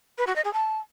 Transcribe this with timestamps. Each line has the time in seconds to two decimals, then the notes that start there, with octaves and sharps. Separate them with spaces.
0.18 B4
0.27 F#4
0.36 D#5
0.45 G#4
0.53 A5